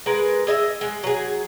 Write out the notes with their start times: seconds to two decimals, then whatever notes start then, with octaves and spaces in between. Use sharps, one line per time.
0.06 G#3 A#4 B4
0.47 G#4 D#5 E5
0.81 G#3
1.04 F#3 G#4